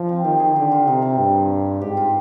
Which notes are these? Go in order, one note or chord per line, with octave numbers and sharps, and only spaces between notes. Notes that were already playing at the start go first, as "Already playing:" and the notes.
Already playing: F3 D4 F4 G#4
C4
D#3 G4
G#4
D3 G4
F4
C3 D#4
C4
G2
G#2 G4
F4